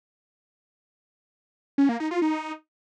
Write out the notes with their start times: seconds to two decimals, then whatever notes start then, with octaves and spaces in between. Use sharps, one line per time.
1.78 C#4
1.89 A#3
2.00 D#4
2.11 F4
2.22 D#4